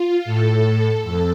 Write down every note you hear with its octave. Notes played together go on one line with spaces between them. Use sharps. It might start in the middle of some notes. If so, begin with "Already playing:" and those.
Already playing: F4
A2 A4
F2 A4